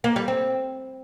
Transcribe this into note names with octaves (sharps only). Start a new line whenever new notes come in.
A#3
G3
C4